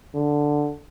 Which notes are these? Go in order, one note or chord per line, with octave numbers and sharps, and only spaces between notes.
D3